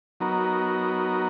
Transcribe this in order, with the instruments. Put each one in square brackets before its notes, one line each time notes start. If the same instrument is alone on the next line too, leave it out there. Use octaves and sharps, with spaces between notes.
[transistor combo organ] F#3 B3 D#4 F#4 A#4